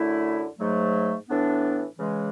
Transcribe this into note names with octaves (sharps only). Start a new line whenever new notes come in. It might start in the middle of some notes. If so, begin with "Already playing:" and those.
Already playing: F#2 D3 A3 E4
G#2 F#3 A3
A2 E3 B3 D4
C#3 E3 G#3